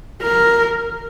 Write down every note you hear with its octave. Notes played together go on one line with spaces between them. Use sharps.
A#4